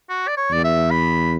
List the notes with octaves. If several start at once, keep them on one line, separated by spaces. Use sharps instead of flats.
F#4
D5
C#5
E2 D5
E5
B5